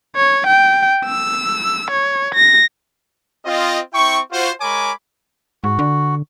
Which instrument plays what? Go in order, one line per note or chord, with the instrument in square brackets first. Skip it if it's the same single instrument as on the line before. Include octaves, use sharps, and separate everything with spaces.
[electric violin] C#5
G5
E6
C#5
A#6
[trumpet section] C4 F4 D#5
C4 E4 G5 C#6
F4 F#4 C5
G#3 A#4 C#5 G#5 B5 D6
[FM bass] G#2 [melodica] F#4
[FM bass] D3